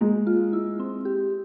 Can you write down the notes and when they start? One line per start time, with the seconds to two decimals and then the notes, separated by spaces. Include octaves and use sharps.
0.01 G#3 A#3
0.27 F4
0.53 E4
0.80 C4
1.05 G4